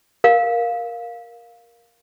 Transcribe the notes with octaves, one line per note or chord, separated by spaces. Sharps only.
A#4 F5